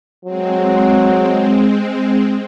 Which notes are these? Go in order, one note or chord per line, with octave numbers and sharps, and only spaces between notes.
F#3 G#3 C4